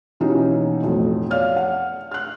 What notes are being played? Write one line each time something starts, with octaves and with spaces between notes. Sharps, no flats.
D#2 B2 E3 C#4 D#4
B1 F2 A2
C#5 D5 F5 F6
F#5
F6 F#6